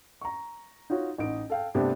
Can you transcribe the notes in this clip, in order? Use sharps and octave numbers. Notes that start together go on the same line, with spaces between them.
A#5 C#6
D#4 F4 F#4 C#5
A1 D#4 D7
A4 F5 G5
G2 C3 A3 B3 C4 D4